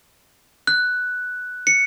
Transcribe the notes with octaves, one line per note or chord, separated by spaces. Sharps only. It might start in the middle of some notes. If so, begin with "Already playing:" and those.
F#6
C#7